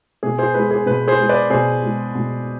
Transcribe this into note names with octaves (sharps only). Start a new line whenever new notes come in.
B2 G#4
G#4 C5
G#3 B4
G#4
B2 B4
G#4 C5
G#3
B4 D5
B2 G#4 C5
G#3
B2